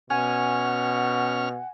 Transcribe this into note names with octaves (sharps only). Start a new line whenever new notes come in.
B2 C#4 F#5 G#5 F6